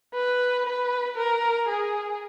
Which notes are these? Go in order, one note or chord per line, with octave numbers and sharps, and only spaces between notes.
B4
B4
A#4
G#4